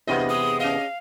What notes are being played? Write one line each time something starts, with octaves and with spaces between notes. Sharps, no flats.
E2 C3 B3 D4 F4 D#5
G#3 D#6
C#4 D#5 F5